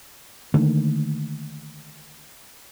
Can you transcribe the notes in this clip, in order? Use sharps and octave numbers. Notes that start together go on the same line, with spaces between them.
D3 D#3 A3 A#3